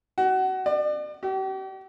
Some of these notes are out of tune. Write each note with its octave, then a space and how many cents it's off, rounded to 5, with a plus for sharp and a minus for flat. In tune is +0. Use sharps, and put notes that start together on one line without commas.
F#4 +25
D5 +35
G4 -40